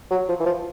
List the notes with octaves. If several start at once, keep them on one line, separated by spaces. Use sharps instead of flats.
F#3
F3
E3
F3